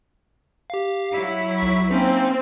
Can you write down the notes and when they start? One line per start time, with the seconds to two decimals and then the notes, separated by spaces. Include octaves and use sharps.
0.70 G4 F5
1.14 F#3 E4
1.58 B1 C#6
1.91 A#3 C4 C#4 D#4